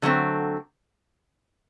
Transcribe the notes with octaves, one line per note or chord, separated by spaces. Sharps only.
D3 F#3 A3 C4